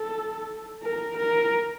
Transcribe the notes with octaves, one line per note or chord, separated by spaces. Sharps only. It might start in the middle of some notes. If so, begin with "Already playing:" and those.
Already playing: A4
A#4
A#4